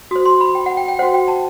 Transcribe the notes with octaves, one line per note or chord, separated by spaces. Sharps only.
F#4 C5 D#6
C6
B5
G5
F#5
G5
G5
F#4 C5 F#5
G5
A5